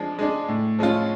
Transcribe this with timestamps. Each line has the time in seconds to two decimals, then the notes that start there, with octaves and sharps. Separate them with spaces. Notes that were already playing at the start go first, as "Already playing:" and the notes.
Already playing: F3 G#3 D4
0.19 G#3 D4 G#4
0.49 A2
0.79 F3 G#3 C#4 F4